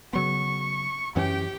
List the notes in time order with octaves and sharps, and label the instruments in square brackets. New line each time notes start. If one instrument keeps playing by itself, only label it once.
[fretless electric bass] C#3 F#3 B3 [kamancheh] C#6
[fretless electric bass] F#2 E3 C#4 [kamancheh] G4 G5